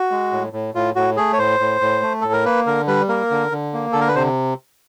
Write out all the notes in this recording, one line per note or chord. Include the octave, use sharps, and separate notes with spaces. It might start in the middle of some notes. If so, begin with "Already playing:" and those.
Already playing: F#4
G#3
A2
A2
A2 F4
A2 F#4
A3 G#4
C#5
A2 C5
A2
A2
A3
A2 A4
A#4
A#3 B4
D3 A#4
G3 B4
A#3 A#4
D3
D3
A#3
D3 A4
A#4
B4
C3 C5